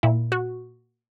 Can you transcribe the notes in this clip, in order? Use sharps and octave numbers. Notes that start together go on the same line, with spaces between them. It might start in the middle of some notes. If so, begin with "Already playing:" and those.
A#2 E4
F#4